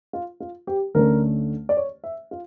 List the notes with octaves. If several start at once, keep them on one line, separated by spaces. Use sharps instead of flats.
F4
F4
G4
D2 D3 A3 C#4 A#4
D5
C#5
E5
F4